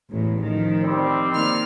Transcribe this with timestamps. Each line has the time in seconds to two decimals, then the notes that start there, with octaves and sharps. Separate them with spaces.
0.11 A1 E2 A2
0.42 D#3 F3
0.82 G3 C4
1.32 D#3 A#3 F6